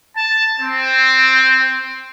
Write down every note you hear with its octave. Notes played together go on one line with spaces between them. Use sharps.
A5
C4